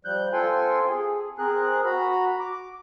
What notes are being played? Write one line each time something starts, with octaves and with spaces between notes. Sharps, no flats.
F3 G3 F#6 G6
C4 F4 A4 G5 G#5 C6
G#4
C4 G#4 A#4 F#6
F#4 A#5 B5
D6